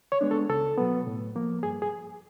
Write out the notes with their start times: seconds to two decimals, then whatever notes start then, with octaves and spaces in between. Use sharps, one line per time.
0.12 C#5
0.21 G#3 B3 D4
0.31 A4
0.49 C#2 A4
0.78 B2 F#3 B3
1.07 A2
1.35 F3 A#3
1.63 G2 G#4
1.82 G#4